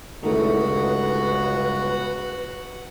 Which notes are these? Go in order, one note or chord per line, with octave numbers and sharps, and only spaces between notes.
G1 C#2 D#3 A3 E4 F#4 B4